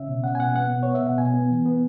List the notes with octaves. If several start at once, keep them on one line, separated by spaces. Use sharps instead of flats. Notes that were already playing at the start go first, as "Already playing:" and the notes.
Already playing: C#3 C#4 E5
B2
C#4 F#5
G#5
B2 F#5
B3 F#5
B2
B3 C#5
E5
B2 F#5
B2 G#5
B3
E3
B3